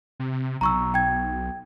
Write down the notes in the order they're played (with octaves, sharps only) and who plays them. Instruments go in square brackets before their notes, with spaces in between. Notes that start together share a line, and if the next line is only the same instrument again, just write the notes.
[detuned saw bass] C3
[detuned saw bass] B1 [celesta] A#5 C#6 E6
[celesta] G5 G#6